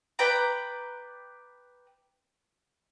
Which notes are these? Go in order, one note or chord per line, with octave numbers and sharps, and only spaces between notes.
B4 D5 G5 A#5